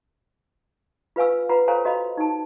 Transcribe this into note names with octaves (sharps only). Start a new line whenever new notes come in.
F4 B4 F5 G#5 E6
F4 B4 F#5 A#5 B5
A4 C5 C#5 F5 G#5 A#5
F#4 D#5 F5 A#5 B5
D#4 A5